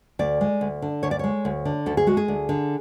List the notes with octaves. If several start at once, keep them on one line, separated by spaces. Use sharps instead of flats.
D2 D5
G#3
D2
D3
D2 C#5
D5
G#3 C#5
D2
D3
D2 A4
G#4
G#3 F#4
G#4
D2
D3